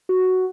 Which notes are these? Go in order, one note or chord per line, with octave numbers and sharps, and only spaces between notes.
F#4